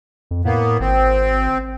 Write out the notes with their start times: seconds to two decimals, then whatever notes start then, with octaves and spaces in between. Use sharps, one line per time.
0.31 F2
0.45 A2 A#3 B3
0.80 G#1 C4